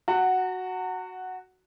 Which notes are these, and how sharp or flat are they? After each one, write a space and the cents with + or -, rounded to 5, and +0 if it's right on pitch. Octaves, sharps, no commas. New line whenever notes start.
F#4 +0 F#5 +5 A#5 -40